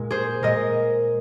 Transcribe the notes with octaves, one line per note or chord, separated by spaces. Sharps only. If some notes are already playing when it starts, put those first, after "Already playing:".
Already playing: A#2 G#3
G#4 C5
A#2 G#3 A#4 D#5